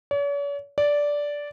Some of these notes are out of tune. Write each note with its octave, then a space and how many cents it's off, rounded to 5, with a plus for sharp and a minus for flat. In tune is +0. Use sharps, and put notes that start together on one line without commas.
C#5 +45
D5 -10